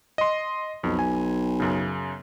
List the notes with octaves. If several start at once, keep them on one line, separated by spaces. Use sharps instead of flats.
D#5 C6
B1 F2
G#5
F#2 C#3